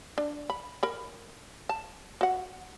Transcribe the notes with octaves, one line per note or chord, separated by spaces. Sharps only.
D4
B5
A#4 B5
A5
F#4 F#5